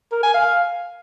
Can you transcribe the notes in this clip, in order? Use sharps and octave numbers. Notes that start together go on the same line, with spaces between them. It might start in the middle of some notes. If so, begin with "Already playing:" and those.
A#4
G#5
F5